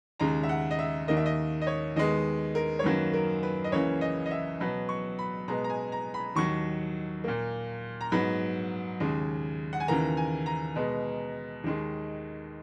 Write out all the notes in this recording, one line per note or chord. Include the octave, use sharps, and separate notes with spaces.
D#2 C#3 G#3 A#5
E5
F#5
D#5
E5
D#2 D#3 A#3 D#5
E5
D#5
D#5
C#5
D#2 D#3 G#3 B3 D#5
A#4
C#5
F#2 D#3 F#3 A#3 B4
A#4
B4
D#5
C#2 C#3 E3 A#3 C#5
D#5
D#5
E5
B2 F#3 B3 B5
C#6
B5
B2 G#3 B3 A#5
A#5
G#5
A#5
B5
D#2 D#3 F#3 C#6
A#2 A#3
A#5
G#2 F#3 B3 B5
D#2 C#3 G#3
F#5
G#5
D#2 C#3 E3 A#3 A#5
G#5
A#5
B2 G#3 B3
D#2 D#3 G#3